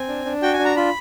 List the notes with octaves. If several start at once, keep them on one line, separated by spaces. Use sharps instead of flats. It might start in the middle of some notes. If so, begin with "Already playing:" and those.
Already playing: C4 G#5
D4
D4
F#4 G5
G#5
D4
A#5
F4 B5